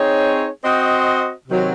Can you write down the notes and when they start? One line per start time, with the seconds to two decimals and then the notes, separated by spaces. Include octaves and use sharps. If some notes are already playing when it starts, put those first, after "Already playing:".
Already playing: C4 D#4 G#4 C#5
0.64 C4 F#4 C5 D#5
1.48 C3 D#3 F#3 C4